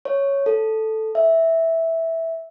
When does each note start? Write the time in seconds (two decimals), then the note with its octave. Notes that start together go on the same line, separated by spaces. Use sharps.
0.05 C#5
0.46 A4
1.15 E5